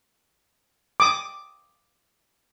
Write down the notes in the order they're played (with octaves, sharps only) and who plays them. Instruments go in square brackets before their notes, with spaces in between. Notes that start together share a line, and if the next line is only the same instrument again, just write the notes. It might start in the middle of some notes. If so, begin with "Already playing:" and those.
[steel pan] D6 D#6